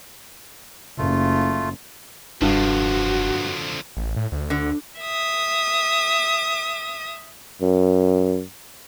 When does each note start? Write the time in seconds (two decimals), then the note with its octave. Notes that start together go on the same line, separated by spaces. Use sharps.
0.98 F#1 A3 F4
2.41 F1 G2 D3 F3 F#4
3.97 A1
4.16 A2
4.32 D2
4.50 D3
5.01 E5 D#6
7.62 F#2